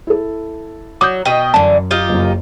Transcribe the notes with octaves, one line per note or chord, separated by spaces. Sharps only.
E4 A4
F#3 D6 D#6 G6
B2 D#5 G5
F#2 D3 E3 A5
D#4 F4 G4
F#1 F#2